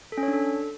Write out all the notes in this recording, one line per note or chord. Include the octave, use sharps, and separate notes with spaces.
A4
C#4
C#5
D4
A4